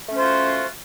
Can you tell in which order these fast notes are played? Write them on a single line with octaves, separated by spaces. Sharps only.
A3 C#4 C5 F4 F#4